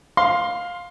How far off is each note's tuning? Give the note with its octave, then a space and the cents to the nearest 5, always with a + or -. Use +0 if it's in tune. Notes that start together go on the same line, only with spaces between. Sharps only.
F5 +15 C6 +0